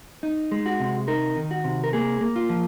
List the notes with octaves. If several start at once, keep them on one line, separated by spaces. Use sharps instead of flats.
D#4
G#3
F#4
C3
D#4 A#4
D#3
F#4
C3
A#4
A#3 G#4
A#3
F4
F3